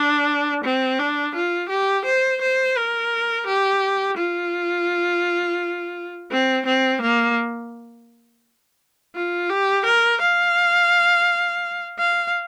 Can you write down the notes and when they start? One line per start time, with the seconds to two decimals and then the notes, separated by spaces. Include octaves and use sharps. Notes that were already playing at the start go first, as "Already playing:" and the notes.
Already playing: D4
0.64 C4
1.00 D4
1.35 F4
1.70 G4
2.05 C5
2.42 C5
2.77 A#4
3.47 G4
4.18 F4
6.32 C4
6.66 C4
7.02 A#3
9.15 F4
9.50 G4
9.86 A#4
10.21 F5
11.99 F5